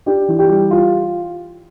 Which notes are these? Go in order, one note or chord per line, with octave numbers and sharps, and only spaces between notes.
D4 G4
E3
G4
G3
F4